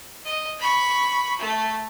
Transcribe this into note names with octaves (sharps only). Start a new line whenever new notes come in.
D#5
B5 C#6
A3